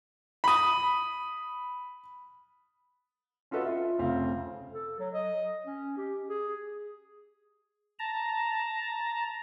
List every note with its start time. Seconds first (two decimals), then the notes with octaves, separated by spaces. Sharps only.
0.44 B5 D#6
3.51 C#4 F4 F#4 A4 B4 D#5
3.64 F4 E5
3.99 F1 C#3 C4 F5
4.73 A4
4.99 F#3
5.14 D#5
5.66 C#4
5.97 G4
6.29 G#4
7.99 A5 A#5